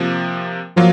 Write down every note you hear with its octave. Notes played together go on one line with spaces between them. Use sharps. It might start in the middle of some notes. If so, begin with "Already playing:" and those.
Already playing: C3 F3 A#3
F3 F#3 A#3 F4